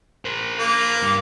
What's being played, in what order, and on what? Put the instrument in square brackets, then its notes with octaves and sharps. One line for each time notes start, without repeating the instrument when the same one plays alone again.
[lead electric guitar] A#4 C5
[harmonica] A#3
[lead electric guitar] G2